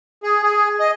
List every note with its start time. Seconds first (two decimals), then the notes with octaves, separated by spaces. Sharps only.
0.23 G#4
0.43 G#4
0.80 D#5